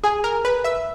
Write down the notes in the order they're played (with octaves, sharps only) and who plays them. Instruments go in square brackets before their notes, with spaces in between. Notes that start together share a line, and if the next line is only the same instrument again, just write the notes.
[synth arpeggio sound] G#4 G#5
A#4 A#5
B4 B5
E5 E6